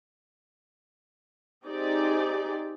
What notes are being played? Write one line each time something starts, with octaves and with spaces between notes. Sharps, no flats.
C4 D#4 G4 G#4 D5